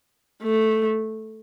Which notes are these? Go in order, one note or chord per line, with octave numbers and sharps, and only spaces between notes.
A3